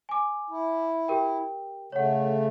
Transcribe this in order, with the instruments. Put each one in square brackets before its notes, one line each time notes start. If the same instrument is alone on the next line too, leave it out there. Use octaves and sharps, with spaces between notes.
[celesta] G#5 D6
[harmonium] E4
[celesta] G4 A#4 G5
[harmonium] C#3 A3 [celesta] C#5 F#5